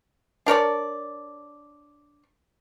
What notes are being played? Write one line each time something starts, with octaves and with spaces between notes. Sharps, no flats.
D4 A#4 C#5 D5